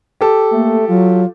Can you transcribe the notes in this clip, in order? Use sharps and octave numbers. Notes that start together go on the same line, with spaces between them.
G4 A4
A3 A#3
F#3 F4